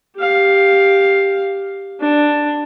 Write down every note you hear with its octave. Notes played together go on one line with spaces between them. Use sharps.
G4 F5
D4